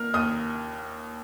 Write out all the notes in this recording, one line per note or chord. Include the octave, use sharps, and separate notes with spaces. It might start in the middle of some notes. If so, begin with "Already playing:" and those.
Already playing: A#3 F6
D#2 D#6